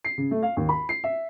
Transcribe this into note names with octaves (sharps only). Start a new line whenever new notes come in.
C7
C#3
A3
F5
D#2
B5
C7
E5